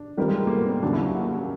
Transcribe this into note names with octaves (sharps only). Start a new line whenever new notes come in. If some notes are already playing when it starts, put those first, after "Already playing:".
Already playing: D4
D#3 G3 C4 F4 A#4
G#3
A3
A#3
B3
C4
D#2 C#3 F#3 D4
E4
F#4
F#4